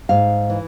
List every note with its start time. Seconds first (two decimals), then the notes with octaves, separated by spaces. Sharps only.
0.09 G#2 F5
0.50 E3